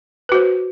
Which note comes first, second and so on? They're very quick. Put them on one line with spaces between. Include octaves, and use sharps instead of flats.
B4 F#4 C5